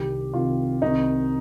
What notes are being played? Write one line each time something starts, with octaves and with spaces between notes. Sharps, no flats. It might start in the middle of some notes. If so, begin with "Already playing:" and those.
Already playing: C2 C3 D#3 G4
C2 C3 D#3 F4
C2 C3 D#3 D#4